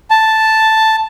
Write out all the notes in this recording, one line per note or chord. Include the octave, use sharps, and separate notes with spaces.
A5